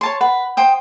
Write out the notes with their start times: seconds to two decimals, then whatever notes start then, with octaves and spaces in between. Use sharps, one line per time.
0.01 C#5 A5 C6
0.21 B4 F#5
0.57 C5 G5 D#6